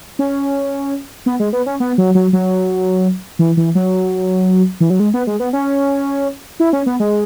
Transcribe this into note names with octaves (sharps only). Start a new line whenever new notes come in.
C#4
B3
G#3
B3
C#4
B3
F#3
F#3
F#3
E3
E3
F#3
E3
F#3
G#3
B3
G#3
B3
C#4
E4
C#4
B3
G#3